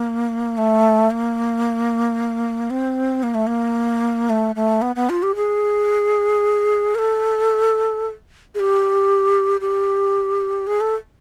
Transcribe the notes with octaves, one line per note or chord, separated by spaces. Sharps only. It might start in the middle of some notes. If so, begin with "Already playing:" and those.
Already playing: A#3
A3
A#3
C4
A#3
A3
A#3
A3
A3
B3
B3
F4
G4
G#4
A#4
A4
G#4
G4
G4
G#4
A4